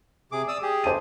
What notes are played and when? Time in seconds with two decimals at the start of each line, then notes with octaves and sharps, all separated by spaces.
0.32 C3 G#4 D6
0.48 D5 D#6 E6
0.62 G4 G#4
0.84 C5 A5 D#7